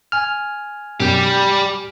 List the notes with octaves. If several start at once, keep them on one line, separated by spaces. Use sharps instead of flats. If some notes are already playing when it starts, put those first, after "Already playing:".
G#5 F6
B1 F#2 G3 G4 G5